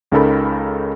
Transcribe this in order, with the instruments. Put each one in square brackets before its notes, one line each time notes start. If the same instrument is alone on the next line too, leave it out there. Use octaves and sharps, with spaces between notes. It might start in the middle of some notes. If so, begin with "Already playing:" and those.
[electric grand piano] C#2 C#3 D#4 A4 A#4 B5